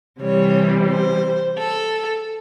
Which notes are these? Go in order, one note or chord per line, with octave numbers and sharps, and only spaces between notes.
C3 E3 G3 C#5
C5
A4